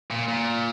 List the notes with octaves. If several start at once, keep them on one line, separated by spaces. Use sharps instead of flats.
A#2
A#2